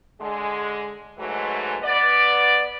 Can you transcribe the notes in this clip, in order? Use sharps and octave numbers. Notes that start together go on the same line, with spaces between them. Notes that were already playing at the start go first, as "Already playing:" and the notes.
D3 G#3
G#2 E3 F#3 G#3 A3
B3 D5